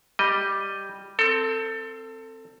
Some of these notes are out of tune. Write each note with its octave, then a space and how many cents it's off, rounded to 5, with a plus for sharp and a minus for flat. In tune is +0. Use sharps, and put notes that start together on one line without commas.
G3 +0 D#5 +0
C4 +0 A4 +25